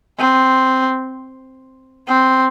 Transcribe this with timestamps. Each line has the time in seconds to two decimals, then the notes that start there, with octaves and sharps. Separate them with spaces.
0.18 C4
2.08 C4